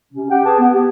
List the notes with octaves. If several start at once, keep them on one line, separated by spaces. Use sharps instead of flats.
C3 C#4
G4 F#5 G5
G#4 B4 A5
B3
G4